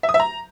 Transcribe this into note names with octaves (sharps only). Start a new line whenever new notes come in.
E5
D#6
E5
A#5